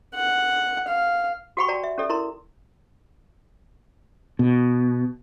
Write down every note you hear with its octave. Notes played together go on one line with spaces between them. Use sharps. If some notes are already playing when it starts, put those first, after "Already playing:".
F#5
F5
F#4 G4 F#5 G5 B5 C#6
F#4 D5 G5 A5 A#5
E5
C#4 G4 A4 D5 E5
E4 A#4 A#5 C6
B2